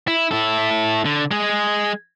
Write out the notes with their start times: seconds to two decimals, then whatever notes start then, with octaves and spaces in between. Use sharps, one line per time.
0.08 E4
0.31 E4 A4
1.05 D3
1.31 G#3 G#4